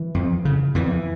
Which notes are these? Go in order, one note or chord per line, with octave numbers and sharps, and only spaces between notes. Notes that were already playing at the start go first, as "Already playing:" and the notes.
Already playing: E3
F2
C#3
F2 E3